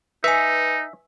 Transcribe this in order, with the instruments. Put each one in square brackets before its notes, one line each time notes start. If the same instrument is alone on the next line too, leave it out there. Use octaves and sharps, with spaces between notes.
[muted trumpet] D#4 [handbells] B4 G#5 [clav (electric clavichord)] E5